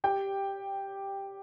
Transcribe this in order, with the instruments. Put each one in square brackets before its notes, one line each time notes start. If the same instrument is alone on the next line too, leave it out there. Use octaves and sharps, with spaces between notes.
[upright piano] G4 G5